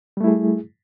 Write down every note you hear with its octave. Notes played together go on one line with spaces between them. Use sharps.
G3 A3 E4 G#4